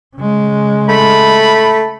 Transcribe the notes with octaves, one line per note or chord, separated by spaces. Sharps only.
C#3 G#3
A3 B5